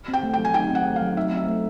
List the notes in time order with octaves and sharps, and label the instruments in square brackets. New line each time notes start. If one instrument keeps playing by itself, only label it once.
[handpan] C4
[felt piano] G5
[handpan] A3
[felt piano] G5
[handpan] F#3
[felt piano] G#5
[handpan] D#4 [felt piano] G5
[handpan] C4 [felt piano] F#5
[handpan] A3
[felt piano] F5
[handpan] F#3
[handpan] D#4 [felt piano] E5
[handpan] C4
[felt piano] E5
[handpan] A3